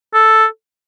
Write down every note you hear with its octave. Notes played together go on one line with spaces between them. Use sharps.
A4